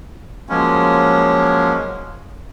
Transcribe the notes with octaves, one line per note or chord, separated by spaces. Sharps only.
F3 F#3 G#3 A#3 C#4